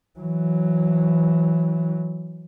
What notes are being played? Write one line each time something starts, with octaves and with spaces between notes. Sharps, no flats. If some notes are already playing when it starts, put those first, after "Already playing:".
E3 F#3